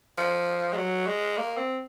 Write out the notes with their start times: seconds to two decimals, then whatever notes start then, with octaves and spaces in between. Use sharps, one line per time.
0.18 F3
0.73 G#3
0.77 F#3
1.07 G#3
1.37 A#3
1.57 C4